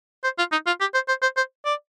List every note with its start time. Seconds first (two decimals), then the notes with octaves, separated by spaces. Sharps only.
0.24 C5
0.38 F4
0.52 D#4
0.67 F4
0.81 G4
0.94 C5
1.08 C5
1.22 C5
1.37 C5
1.65 D5